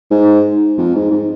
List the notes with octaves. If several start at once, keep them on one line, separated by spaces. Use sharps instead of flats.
G#2
F2
G#2
G#2